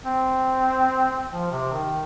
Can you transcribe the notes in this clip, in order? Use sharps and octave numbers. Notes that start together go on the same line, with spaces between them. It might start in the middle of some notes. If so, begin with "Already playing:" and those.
C4
F3
C3
D#3